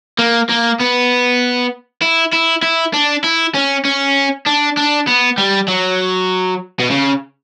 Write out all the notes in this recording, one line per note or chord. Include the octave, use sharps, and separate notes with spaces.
A#3
A#3
B3
E4
E4
E4
D4
E4
C#4
C#4
D4
D4
B3
G3
F#3
B2
C#3